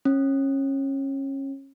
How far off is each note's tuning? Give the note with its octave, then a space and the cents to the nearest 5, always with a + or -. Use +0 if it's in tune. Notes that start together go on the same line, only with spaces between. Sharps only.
C#4 -25